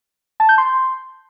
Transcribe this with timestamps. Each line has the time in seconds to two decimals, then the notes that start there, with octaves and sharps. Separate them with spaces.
0.40 A5
0.49 G6
0.58 C6